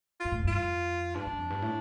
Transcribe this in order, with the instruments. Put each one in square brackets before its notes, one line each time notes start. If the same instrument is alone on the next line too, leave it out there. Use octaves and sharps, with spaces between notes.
[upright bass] G2 [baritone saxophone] F4
[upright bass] A2
F2
[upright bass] G2 [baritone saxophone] F4
[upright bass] F2
[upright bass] G2 [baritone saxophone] D4
[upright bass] G2
F2
G2
A2